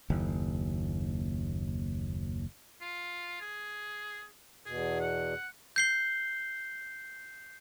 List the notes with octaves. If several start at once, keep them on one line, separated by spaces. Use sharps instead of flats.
F#1 D#2
F4
G#4
E2 B2 G#4
F#5
G6 C7 G7